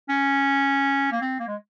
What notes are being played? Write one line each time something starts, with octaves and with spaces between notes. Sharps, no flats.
C#4
A#3
C4
A#3
G#3